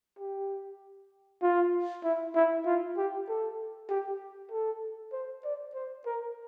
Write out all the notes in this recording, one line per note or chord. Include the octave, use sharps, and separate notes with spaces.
G4
F4
E4
E4
F4
G4
A4
G4
A4
C5
D5
C5
A#4